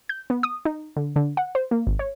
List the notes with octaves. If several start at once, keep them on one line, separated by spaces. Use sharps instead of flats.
G6
B3
D#6
D#4
D3
D3
F#5
C5
A#3
G#1
C#5